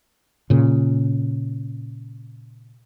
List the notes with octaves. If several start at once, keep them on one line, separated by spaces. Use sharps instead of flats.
A#2 C#3